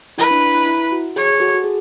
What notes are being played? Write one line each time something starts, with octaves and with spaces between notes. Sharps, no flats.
E4 B4
D4
E4
E4
F#4
G#4 C#5
F#4 A4
F#4
G#4